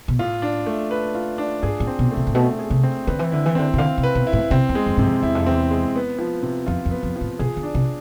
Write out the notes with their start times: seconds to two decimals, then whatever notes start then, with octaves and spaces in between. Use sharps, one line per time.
0.08 B2
0.19 A2 F4
0.42 D4
0.66 A3
0.91 B4
1.15 F4
1.38 D4
1.63 G#2 G#4
1.80 A2
1.87 C4
1.99 B2
2.11 A3
2.17 C3
2.27 A2
2.35 B2 A3
2.59 G#4
2.70 C3
2.83 C4
3.07 D3 B4
3.19 E3
3.31 D3 E4
3.46 E3
3.55 D3 C4
3.74 C3
3.78 D3 F5
3.97 C3
4.03 B4
4.15 B2
4.27 E4
4.33 A2
4.51 C3 C4
4.69 E2
4.75 G#3
4.86 F2
4.97 G#2 C3
5.05 F2
5.22 E2 E4
5.35 F2
5.46 E2 C4
5.71 G#3
5.96 B3
6.19 F3
6.43 C3
6.66 F2 F4
6.86 F2
6.91 B3
7.03 F2
7.16 F3
7.21 A2
7.39 B2 G#4
7.57 D3
7.63 D4
7.75 C3